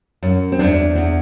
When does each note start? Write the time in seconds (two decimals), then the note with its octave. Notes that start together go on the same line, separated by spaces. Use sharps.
0.23 F#2
0.52 C4
0.59 E2 D4
0.95 E2